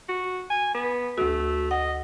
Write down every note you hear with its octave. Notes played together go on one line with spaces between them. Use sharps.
F#4
G#5
B3
D2 A3 F#4
D#5 F#5